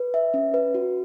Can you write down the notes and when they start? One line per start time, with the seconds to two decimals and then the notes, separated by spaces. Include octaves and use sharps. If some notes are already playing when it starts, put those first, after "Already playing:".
Already playing: B4
0.14 E5
0.34 C#4
0.54 B4
0.74 F#4